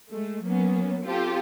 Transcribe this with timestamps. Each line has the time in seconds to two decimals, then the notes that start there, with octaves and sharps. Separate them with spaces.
0.11 G#3 A3
0.44 F#3 A#3 B3 C#4
1.04 C4 F4 G4 A4